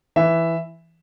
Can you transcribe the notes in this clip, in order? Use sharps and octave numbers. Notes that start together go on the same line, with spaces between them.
E3 E5